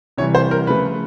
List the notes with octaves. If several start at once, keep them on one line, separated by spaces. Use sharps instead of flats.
C3 E3 G3 C#5
C5
A#4
C#3 F3 A3 B4